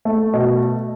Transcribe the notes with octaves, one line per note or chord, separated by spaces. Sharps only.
A3
B2 D#5